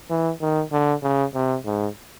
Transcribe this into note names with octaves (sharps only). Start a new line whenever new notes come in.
E3
D#3
D3
C#3
C3
G#2